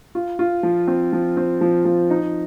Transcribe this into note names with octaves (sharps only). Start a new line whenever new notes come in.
F4
F4
F3
C4
F3
C4
F3
F3
D#4